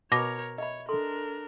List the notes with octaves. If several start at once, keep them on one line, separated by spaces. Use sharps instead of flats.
B2 A#4 C#5 D6 A#6
C#5 D#5 E5 B5
D4 A4 A#4 C6